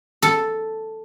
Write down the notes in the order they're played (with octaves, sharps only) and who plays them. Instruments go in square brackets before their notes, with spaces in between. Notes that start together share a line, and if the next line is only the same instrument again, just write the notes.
[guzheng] A4